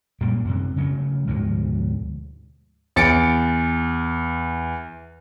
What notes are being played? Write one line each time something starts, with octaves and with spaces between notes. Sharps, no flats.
F#2 A#2 G3 A#3
F#2 C3
C#3 F#3 A3
D2 G#2 B2 F3
E2 A6 C#7 D7